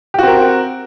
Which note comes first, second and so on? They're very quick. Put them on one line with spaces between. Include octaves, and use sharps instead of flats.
G4 F#4 C4 A#4